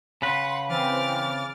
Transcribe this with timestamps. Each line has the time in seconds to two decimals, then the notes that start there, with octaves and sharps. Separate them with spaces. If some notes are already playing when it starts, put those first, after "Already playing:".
0.22 C#3 B4 F#5 C6
0.69 E3 C4 D6 F6 A6